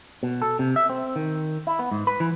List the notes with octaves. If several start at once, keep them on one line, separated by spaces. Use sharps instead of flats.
B2
A4
C3
E5
C4
D#3
E4
B3
G#2
B4
E3